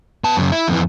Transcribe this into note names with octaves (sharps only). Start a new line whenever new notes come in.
B3 A5
F#2 C#3
E4
F2 E3